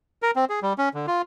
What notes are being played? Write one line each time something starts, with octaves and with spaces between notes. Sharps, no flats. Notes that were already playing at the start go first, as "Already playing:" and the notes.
A#4
C4
G#4
G3
C#4
D3
F4